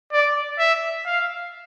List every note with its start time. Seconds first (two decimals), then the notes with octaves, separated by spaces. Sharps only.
0.13 D5
0.59 E5
1.05 F5